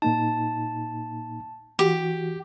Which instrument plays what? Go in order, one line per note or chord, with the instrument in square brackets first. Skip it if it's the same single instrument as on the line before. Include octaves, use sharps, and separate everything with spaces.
[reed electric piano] A#2 A#3 D#4 [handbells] A5
[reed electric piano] E3 F#4 [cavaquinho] G4